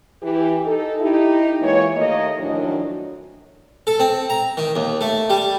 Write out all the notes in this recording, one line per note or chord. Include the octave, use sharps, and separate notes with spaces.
E3 G4
D#4 A4
D#4 E4 G4
E3 G#3 A#3 F4 C#5
D#2 A3 A#3 D#5
F#2 A2 D#3 F3 F#3 D4
A4
C4
A#5
D#3
D#2
A3
G3